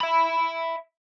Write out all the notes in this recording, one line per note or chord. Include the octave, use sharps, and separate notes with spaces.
E5 B5